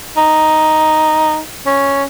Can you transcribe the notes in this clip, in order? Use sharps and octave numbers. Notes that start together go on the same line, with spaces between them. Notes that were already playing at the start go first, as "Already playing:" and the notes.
D#4
C#4